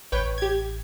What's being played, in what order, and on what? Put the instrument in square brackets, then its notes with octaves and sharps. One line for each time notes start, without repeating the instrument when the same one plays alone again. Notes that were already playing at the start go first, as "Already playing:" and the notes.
[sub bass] A1 [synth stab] B4 C#5 G5
[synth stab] G4 G#6